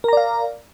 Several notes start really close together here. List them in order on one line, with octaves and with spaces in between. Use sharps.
A#4 A#5 D5 F5